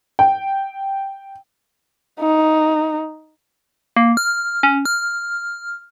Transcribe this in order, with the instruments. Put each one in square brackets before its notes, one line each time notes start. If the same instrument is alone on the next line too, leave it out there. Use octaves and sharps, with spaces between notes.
[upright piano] G5
[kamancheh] D#4
[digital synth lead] A#3
F6
C#4
F6